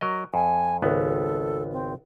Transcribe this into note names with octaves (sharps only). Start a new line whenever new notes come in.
F#3 A#4 D#5
F2 G#5
G#1 C#2 B3 A4
C4